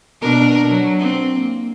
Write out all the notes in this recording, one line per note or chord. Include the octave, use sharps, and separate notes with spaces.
B2 D4 A#4
F#3
C4
A#3